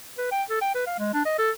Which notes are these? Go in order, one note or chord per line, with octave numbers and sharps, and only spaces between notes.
B4
G5
A4
G5
B4
F5
G#3
D4
D#5
A4